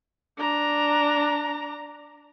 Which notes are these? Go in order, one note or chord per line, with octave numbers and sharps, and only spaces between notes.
D4 A#5